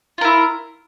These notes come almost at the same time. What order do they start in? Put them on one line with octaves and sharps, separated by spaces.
F4 A#4 E4